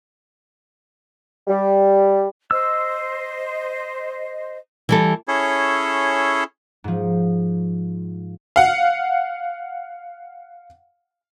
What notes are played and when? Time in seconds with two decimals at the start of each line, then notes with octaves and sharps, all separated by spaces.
1.48 G3
2.51 C5 D#5 E6
4.89 E3 G3 A4
5.28 C#4 E4 G#4 A4 C#5
6.84 G#2 F3
8.56 F5 F#5